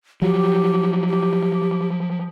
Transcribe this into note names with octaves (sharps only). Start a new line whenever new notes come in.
F3 F#3 G4
G4